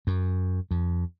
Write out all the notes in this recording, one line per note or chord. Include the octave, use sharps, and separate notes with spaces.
F#2
F2